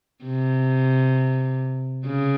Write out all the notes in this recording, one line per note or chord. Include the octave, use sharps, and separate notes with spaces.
C3
C#3